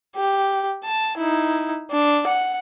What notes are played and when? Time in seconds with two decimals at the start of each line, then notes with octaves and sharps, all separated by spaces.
0.16 G4
0.84 A5
1.18 D#4 E4
1.91 D4
2.27 F#5